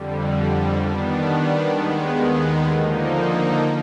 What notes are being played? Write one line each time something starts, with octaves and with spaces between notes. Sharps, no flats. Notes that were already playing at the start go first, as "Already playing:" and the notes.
Already playing: F2 D3 G3
D#3 G3 B3 D4
D#2 D#3 G#3 B3
D3 F3 A#3 D#4